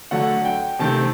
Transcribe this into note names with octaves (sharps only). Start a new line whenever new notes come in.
D3 F#3 A3 F#5
G5
C3 D#3 A3 C4 A5